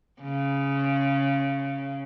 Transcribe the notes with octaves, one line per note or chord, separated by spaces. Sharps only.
C#3